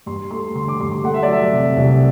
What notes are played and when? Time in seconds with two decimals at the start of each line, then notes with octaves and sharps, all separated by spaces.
0.06 G2 C6
0.31 A3 C6
0.55 D3 C6
0.68 D6
0.80 G2 C6
0.91 C6
1.04 A3 F#5
1.14 E5
1.23 D5
1.28 F#3 E5
1.53 C3
1.77 C2